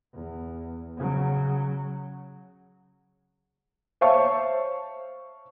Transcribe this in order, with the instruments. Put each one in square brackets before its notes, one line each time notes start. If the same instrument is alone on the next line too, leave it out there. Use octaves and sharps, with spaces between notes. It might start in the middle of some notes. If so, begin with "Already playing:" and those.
[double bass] E2
C#3 F#3
[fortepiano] C5 C#5 E5 F5 A5 C#6